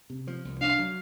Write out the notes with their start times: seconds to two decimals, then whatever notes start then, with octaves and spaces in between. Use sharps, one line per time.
0.10 C3
0.27 F3
0.45 C2
0.61 D4 F5
0.79 F#3